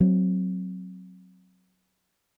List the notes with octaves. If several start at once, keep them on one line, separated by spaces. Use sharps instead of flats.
F#3 C4